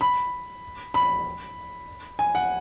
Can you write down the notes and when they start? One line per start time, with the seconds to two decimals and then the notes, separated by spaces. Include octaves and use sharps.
0.01 B5
0.94 B5
2.19 G#5
2.35 F#5